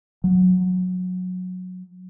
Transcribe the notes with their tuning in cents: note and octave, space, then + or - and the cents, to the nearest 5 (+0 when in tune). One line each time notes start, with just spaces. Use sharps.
F#3 -15